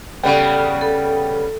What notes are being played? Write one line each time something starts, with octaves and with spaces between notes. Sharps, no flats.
C#3 G3 B3 A4 G5
A4